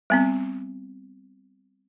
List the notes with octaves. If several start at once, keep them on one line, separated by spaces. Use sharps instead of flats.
G3 B3 C4